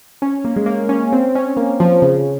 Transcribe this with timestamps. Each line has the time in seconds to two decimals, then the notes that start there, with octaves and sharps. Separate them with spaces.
0.22 C#4
0.45 A#3
0.56 G#3
0.66 A#3
0.89 C#4
1.13 C4
1.35 C#4
1.57 A#3
1.80 F3
2.02 C#3